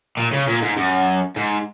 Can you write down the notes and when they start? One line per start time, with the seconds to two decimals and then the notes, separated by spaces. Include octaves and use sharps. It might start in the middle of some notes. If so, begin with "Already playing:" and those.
0.17 A#2
0.32 C#3
0.48 A#2
0.62 G#2
0.77 F#2
1.36 G#2